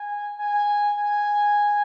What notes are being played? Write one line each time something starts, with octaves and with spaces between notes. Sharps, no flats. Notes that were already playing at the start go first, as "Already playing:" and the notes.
Already playing: G#5
G#5
G#5